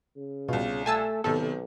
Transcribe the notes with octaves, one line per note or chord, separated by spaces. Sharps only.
C#3
C2 B2 F4
A3 G#5 A5 E6
B1 C3 D#3 B3 A4